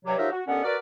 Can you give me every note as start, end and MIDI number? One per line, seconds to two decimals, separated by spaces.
0.05 0.18 43
0.05 0.18 48
0.05 0.18 54
0.18 0.29 53
0.18 0.29 54
0.18 0.29 63
0.18 0.29 67
0.18 0.29 70
0.18 0.29 76
0.31 0.41 66
0.47 0.61 39
0.47 0.61 50
0.47 0.61 59
0.47 0.61 61
0.47 0.61 69
0.47 0.61 78
0.64 0.76 66
0.64 0.76 70
0.64 0.76 71
0.64 0.76 74